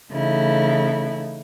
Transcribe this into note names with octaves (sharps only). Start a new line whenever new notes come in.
C#3 E3 A3 D#4 E4 A4